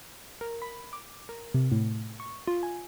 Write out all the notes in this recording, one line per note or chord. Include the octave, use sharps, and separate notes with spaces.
A#4
B5
D6
A#4
C3
A2
C#6
F4
G#5